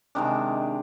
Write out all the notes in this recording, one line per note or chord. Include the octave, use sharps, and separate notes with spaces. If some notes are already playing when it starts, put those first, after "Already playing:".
C3 D#3 G#3 D4